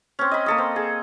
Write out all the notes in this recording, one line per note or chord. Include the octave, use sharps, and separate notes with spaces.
C4 C#4
D#5 B5
A#3 A4 D#6
C4
G#4